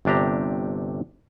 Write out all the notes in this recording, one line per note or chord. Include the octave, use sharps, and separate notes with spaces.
G1 C3 D4 G4 A#5